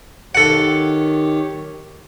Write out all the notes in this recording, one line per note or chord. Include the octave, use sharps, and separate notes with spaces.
D#3 G4 A4 C#5 F#5